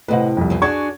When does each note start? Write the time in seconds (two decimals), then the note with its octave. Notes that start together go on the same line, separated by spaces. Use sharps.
0.08 A2 C3 B4 D#5 F#5
0.37 C2 F2
0.50 E2 E3
0.62 D4 F#4 G#4 C#6 G#6